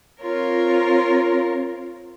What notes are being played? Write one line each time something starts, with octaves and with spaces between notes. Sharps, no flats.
C4 F4 A#4 C#5